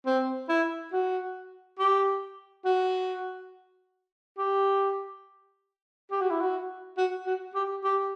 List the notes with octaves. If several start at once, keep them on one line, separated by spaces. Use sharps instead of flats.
C4
E4
F#4
G4
F#4
G4
G4
F#4
E4
F#4
F#4
F#4
G4
G4